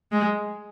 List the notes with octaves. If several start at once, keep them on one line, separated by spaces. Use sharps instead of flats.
G#3